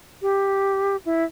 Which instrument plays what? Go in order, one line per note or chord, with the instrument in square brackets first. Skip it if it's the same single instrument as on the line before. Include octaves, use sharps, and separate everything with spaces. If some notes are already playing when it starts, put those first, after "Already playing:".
[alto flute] G4
E4